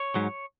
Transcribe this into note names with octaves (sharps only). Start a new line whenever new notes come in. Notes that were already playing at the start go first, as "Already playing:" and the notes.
Already playing: C#5
G#2 F#3